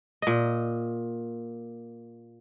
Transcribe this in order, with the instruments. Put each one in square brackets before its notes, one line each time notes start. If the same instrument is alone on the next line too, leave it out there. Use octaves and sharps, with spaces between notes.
[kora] A#2 D#5